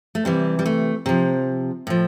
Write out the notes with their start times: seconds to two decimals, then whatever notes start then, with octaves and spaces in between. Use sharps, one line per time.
0.15 A3
0.25 C3 E3 G3
0.59 G3
0.66 A3
1.06 C3 F3
1.87 A2 F3